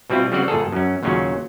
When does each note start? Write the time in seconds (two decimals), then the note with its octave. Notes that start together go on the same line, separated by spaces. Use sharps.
0.10 B2 G3 C4 E4 F4
0.32 C#3 F#3 G3 C4 D5 F#5
0.48 G1 A#2 G#4 A4
0.72 F#2 C#4
1.03 D#2 A#2 C#3 F#3 C#4